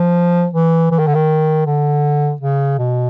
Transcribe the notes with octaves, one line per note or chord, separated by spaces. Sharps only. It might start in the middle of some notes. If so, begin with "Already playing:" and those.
Already playing: F3
E3
E3
D#3
D3
D#3
D3
C#3
B2